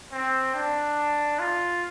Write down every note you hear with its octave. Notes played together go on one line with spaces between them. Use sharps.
C4
D4
F4